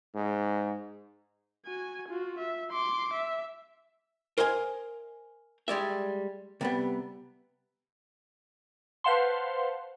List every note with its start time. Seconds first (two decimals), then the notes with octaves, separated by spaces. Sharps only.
0.15 G#2
1.66 F#4 G#5
2.09 F4 F#4
2.39 E5
2.71 C6 D6
3.14 E5
4.38 A#4 C5 D#5 F5 G5 G#5
5.68 G3 G#3 D5 E5
6.61 C3 G3 B3
9.04 B4 C5 F5 F#5 A5 C6